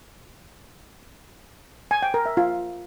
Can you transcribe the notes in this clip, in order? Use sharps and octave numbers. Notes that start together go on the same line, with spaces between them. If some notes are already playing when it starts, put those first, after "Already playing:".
G#5
G5
A#4
E5
F4